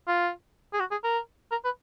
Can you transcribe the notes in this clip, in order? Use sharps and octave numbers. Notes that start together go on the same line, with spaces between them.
F4
G#4
F#4
G#4
A#4
A#4
B4